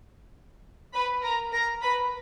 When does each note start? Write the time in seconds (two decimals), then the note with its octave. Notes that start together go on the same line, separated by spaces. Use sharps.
0.94 B4 B5
1.23 A#4 A#5
1.52 A#4 A#5
1.81 B4 B5